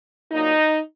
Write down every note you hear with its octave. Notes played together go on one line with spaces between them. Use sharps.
A#2 F#3 A#3 D#4